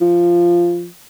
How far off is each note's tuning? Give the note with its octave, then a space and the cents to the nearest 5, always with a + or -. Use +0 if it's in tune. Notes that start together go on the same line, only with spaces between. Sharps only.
F3 -10